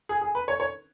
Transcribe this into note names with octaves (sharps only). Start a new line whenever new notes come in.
G#4
G#4
B4
C#5
C#5